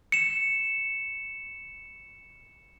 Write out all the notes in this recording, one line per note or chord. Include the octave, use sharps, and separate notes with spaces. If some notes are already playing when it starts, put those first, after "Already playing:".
C#7 E7